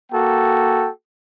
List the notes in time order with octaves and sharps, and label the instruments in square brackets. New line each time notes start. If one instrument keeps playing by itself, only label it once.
[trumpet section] A#3 F#4 A4 G5